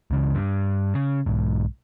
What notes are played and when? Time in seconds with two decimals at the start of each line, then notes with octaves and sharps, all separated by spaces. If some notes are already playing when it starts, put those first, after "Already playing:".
0.11 C#2 C#3 E3
0.35 G2
0.95 C#3
1.26 B1 G#2